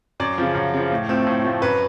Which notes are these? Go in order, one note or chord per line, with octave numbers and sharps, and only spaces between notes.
F#2 D5
C#3 F3
F#2
C#3 F3
A2
F3 A3 C4
A2
F3 A3 C4
F#2 B4